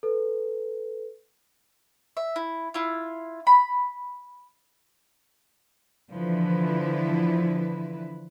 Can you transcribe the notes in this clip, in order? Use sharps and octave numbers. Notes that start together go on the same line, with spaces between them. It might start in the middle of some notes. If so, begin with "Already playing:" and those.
A4 B4
E5
E4
E4 F4
B5
D3 E3 F3 E4 B4